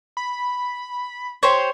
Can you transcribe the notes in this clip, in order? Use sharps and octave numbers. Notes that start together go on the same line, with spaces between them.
B5
G4 C5 C#5 C6